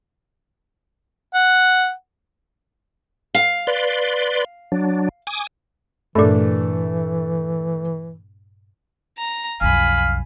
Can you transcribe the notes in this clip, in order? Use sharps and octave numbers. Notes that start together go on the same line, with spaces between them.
F#5
F5
B4 D5 C6
F#3 D4
G#5 D6 D#6
G2 A#2 E3 A3 D4
A#5
B1 F2 F5 G#5 B5